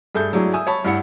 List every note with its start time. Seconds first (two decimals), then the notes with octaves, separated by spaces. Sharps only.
0.15 G2 G#4 A4 E5 G6
0.33 F#3 G#3 D4 E4 G#4
0.53 E5 G#5 D#6 E6
0.67 C#5 A5 B5 C#6
0.85 G2 E4 F#5 C#7